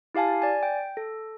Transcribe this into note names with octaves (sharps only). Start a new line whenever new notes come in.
E4 G4 F5 G#5 A5
D5 G#5
G5
A4